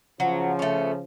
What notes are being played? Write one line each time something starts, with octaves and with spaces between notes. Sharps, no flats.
C#3 F3 F#3
A3 C#4